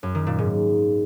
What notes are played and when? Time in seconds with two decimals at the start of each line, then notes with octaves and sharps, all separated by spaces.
0.03 F#2
0.15 D#3
0.27 A#2
0.38 G#2